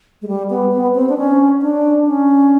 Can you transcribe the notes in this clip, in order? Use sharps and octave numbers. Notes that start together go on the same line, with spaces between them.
G#3
G3
B3
B3
C4
D4
C#4
D4
C#4